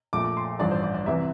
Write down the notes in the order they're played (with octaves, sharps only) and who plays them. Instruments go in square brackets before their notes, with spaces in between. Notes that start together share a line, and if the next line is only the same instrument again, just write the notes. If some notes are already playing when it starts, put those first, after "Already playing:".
[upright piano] A#1 A#2 A3 D6
D6
C6
A1 G2 F3 D5
C5
D5
D5
C2 C3 E3 E5